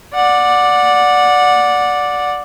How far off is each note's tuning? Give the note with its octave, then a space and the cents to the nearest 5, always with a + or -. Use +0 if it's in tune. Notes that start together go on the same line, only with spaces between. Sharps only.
D5 +0 F#5 -20